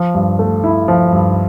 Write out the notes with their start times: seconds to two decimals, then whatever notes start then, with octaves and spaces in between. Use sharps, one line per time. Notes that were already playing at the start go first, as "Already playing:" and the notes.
Already playing: F3
0.14 G2
0.39 A3
0.64 E4
0.88 F3
1.13 G2